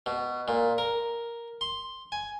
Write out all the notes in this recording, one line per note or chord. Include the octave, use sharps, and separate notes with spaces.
B2
A#2
A#4
C6
G#5